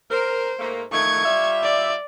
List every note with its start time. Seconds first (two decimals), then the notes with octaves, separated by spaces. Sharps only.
0.11 A#4 C5
0.59 G#2 A3 A#3
0.92 D#3 F3 A3 C#6 G#6
1.24 G3 F4 E5
1.63 D5